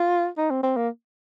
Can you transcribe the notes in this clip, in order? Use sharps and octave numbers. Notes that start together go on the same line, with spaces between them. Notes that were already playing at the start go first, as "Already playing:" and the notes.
Already playing: F4
D#4
C4
C4
A#3